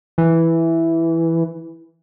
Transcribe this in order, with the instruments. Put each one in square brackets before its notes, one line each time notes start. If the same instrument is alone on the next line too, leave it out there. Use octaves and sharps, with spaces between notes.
[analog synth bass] E3